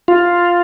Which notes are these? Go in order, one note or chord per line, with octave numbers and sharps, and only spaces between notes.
F4